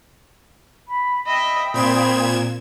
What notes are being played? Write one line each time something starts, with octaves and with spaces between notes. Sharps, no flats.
B5
D#5 E5 G5 B5 D#6
A#2 C4 G#6 E7